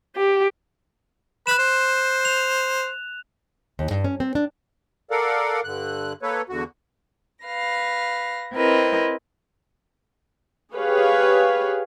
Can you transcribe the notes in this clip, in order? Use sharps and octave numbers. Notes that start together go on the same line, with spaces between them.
G4
B4 B5 F#6 E7
C5
F7
D#2
G2
C#4
C4
D4
A4 A#4 D5 F5 F#5
G2 D3 F#6
A#3 A4 B4 C#5
E2 D3 F#4
B4 F5 A#6
C4 E4 A#4 B4 D#5
G4 G#4 B4 C#5 F5